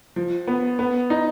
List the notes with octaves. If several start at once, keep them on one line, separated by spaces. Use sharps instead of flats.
F3
B3
B3
D#4